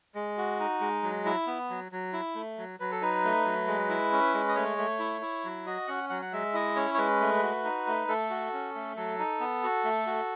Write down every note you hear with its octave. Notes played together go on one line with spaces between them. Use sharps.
G#3
F#4
D#4
G#3
F#3
E4
B3
F#3
F#3
E4
A3
F#3
F#3 B4
A4
D#4 B4
A3
F#3
G#3
E4
C#4
G#3
D#5
A3 C#5
A3
E4
E4
F#3
F#4 D#5
C#4 F#5
F#3 F#5
F#5
G#3 E5
E4 D#5
C#4 C#5
C#5
G#3 B4
A3
F#4
D#4
A3
A3 A4
F#4
C#4
A3
F#3 A4
D#4
B3
F#4
A3
F#4